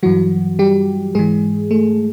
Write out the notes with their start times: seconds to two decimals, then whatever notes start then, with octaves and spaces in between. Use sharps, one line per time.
0.03 G2 E3 F#3 F#4
0.59 G3 G4
1.15 G#2 E3 G#3 G#4
1.71 A3 A4